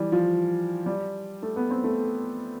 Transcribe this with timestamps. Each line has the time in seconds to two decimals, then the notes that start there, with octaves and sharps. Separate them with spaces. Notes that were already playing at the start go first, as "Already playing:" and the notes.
Already playing: E3 G3
0.12 F3
0.86 G3
1.42 A3
1.56 B3
1.71 C4
1.84 A3